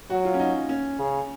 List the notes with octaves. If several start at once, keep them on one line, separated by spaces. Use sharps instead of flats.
F#3 F#4
F4
C#4
D#4
C#4
C#3